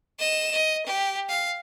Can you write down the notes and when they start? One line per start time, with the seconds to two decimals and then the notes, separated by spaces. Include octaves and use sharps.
0.19 D#5 E7
0.51 D#5
0.87 G4
1.29 F5